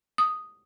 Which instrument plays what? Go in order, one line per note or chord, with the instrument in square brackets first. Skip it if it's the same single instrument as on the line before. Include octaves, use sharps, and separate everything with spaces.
[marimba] D#6